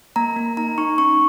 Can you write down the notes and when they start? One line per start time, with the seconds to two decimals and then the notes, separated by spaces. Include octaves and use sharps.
0.16 A#3 A#5
0.36 A#3
0.57 D#4 A#5
0.78 D#4 C#6
0.98 C#4 C#6